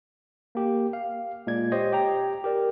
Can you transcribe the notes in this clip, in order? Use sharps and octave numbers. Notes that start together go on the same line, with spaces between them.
A#3 G4
F5
A#2 G#3 D5 G#6
G4 C5 C#5 D#5
G4 G5 A#5
G4 A#4 D5